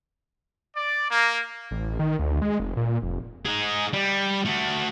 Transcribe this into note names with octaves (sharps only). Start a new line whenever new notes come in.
D5
A#3
A1
D#3
D2
G#3
F1
A#2
F1
D#4 G#4
G3
A3 F#4